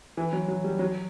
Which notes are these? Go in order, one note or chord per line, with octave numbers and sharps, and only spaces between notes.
E3
F#3
F#3
G3
F#3